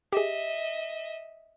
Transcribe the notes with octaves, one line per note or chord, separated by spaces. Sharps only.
G4 G#4 D#5 E5